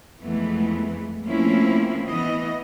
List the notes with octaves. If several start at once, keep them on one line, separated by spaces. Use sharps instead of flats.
F2 E3 G#3 A3 B3
F3 A3 A#3 C4 C#4 E4
E3 B3 D#5